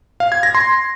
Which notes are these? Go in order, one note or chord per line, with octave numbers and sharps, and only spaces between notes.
F5
G#6
A#6
C6